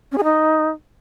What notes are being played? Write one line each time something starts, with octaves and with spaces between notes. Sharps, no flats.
C#4
G#4
D#4